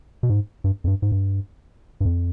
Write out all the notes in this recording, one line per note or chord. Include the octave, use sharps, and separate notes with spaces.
B2
G#2
G2
F2
G2
G#2
G2
G2
F2